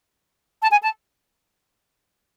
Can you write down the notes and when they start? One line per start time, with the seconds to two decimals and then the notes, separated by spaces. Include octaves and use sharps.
0.62 A5
0.71 G#5
0.82 A5